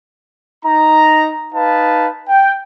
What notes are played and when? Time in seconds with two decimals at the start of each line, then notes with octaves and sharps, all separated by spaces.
0.65 D#4 A#5
1.54 D#4 B4 F5 A5
2.29 G5